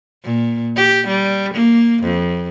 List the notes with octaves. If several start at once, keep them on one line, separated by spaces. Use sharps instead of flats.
A#2
G4
G3
A#3
F2